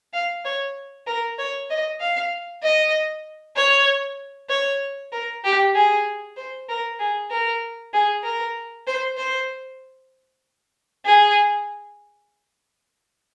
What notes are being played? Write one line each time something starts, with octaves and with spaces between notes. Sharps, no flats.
F5
C#5
A#4
C#5
D#5
F5
D#5
C#5
C#5
A#4
G4
G#4
C5
A#4
G#4
A#4
G#4
A#4
C5
C5
G#4